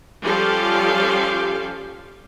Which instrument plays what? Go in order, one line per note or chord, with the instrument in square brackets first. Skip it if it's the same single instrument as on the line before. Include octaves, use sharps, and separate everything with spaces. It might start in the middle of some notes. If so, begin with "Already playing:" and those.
[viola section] F3 G3 C#4 G4 A4 F5